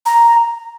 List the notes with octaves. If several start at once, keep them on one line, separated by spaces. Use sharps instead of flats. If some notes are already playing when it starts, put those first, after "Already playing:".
A#5